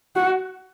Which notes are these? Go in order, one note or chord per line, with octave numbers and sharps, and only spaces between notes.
F#4